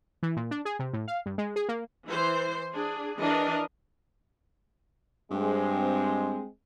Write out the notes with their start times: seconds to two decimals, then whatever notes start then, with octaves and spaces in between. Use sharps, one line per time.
0.23 E3
0.36 A#2
0.51 D4
0.65 G#4
0.79 C3
0.93 A2
1.08 F5
1.26 G2
1.38 G#3
1.56 G#4
1.69 A#3
2.07 E3 C5
2.74 D4 G#4
3.18 E3 D4 A#4 D#5
5.31 G2 G#3 C4